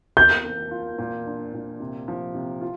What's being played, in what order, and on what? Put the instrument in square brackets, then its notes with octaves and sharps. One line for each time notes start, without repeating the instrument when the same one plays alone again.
[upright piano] A#4 [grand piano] G6
[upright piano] A#3
F4
A#2
D4
A#2
C3
F3
C3
F4